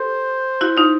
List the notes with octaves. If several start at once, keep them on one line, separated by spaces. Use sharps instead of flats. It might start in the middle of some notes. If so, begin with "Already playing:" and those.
Already playing: G4 A4 C5
E4 F#4
D#4 F4